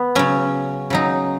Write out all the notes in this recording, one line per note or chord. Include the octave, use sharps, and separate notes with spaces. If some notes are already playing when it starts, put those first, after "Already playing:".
Already playing: B3
C#3 F#3 C#4
C#3 F#3 D#4